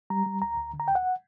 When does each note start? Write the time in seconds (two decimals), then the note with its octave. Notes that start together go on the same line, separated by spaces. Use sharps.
0.10 G3 A#5
0.26 G3
0.42 D2 A#5
0.57 D2
0.73 D3
0.80 A#5
0.88 D2 G5
0.95 F#5